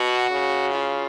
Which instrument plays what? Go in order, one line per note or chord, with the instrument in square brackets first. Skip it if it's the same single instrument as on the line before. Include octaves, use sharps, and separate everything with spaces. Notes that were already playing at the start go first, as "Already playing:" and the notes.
Already playing: [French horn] B2 [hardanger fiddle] F#4
[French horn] C#3
[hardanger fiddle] F4